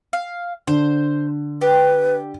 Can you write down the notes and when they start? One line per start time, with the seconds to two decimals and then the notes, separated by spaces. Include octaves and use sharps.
0.13 F5
0.67 D3 C5
1.61 G4 B4